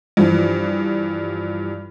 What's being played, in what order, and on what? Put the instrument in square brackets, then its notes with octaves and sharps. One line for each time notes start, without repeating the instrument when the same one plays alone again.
[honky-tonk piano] G2 E3 F3